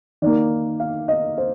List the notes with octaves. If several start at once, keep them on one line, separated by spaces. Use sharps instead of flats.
D#3 A#3 D5
F5
D#5
C5